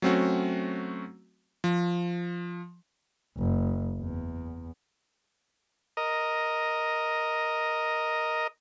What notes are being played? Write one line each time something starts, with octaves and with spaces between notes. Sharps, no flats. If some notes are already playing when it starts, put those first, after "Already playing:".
F#3 A3 C4 C#4 F#4
F3
F#1
E2
A#4 D#5